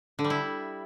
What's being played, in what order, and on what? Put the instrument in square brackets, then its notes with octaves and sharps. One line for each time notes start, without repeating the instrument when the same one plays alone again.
[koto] D3
G3
E4